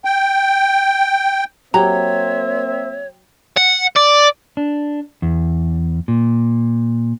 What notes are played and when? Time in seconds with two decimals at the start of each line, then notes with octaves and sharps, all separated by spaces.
0.05 G5
1.74 F#3 A#3 C4 G4 C#5 E5 A#5
3.57 F#5
3.96 D5
4.57 D4
5.22 E2
6.08 A#2